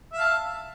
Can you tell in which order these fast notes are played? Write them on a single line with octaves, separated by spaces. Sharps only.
E5 F5 A5